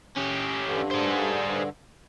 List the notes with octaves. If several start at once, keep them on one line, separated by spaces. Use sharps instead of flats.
C#4 G4
G2 D3
G#4 C5